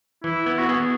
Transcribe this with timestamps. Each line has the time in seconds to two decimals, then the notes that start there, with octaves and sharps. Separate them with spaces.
0.24 E3 E4
0.46 B3 E4
0.58 F#4
0.68 B3 G#4